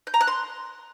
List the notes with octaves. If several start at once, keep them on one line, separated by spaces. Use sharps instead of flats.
G6
A#5
F#6
C6